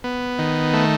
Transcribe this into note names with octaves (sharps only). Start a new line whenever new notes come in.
B3
D#3
A3